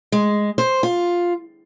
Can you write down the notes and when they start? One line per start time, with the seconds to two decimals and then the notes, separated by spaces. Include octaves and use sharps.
0.12 G#3
0.58 C5
0.83 F4